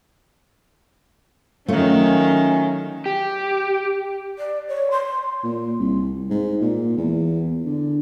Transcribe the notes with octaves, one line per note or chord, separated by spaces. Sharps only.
D#3 F#3 A3 C#4 F4
G4
D5
C#5
C6
A#2
C2
G#2
A#2
E2
D3